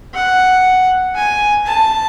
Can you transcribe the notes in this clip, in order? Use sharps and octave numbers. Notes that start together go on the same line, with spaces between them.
F#5
G#5
A5